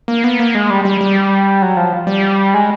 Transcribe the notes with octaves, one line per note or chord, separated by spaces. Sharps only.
A#3
B3
A#3
G#3
G3
G3
G3
F#3
F3
G3
G#3